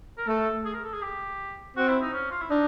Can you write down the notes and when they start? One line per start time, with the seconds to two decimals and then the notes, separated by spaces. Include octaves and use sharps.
0.18 A#4
0.28 A3 A4
0.65 G#4
0.74 A#4
0.84 A4
0.93 G#4
1.02 G4
1.77 C4 F#4
1.88 E4
2.01 D#4
2.13 C#4
2.31 F4
2.41 E4
2.50 D4 D#4